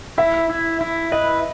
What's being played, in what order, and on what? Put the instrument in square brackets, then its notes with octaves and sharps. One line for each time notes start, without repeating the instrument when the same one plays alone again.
[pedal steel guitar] E4 [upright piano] E5
[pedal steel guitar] E4
E4
[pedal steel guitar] B4 [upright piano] D#5